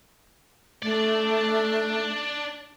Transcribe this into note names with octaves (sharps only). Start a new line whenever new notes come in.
A3 D4 D5